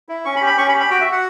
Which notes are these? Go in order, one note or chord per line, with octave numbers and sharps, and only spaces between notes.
E4
C#4 C#6
B5
G4
B5
C#4 C#6
B5
G4
B5
F#4 G5
E5
F#4 F#5